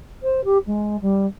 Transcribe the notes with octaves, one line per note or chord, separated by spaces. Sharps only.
C5
G4
G#3
G3